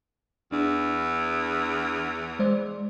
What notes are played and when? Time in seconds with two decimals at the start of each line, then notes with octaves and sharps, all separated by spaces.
0.52 E2 D4
2.39 G#3 C5 D5